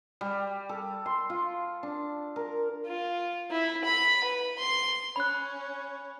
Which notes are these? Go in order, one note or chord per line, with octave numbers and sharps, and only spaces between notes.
G3
A4
C6
F4
D4
A#4
F4
E4
B5
B4
C6
C#4 B5 F#6